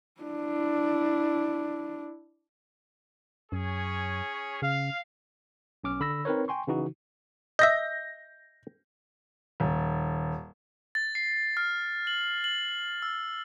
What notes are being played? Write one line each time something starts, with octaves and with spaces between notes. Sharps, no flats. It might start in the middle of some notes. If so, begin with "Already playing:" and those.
D4 E4
F#2 C#4 G#4 C#5
C#3 F5
B1 C#4 D6 F6
D3 B5 E6 A#6
C4 D#4 A#4 B4 C#5
G5 G#5 C6 C#6
C#3 E3 D#4 F#4
D#5 E5 G6 A#6
D#1
A6
C7
F6
F#7
F#7
E6